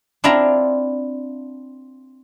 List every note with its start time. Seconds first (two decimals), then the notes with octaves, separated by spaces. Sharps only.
0.24 C4 D4 E4 F4 A#5